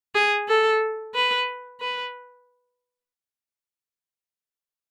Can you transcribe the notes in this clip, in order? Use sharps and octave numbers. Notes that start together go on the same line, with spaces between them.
G#4
A4
B4
B4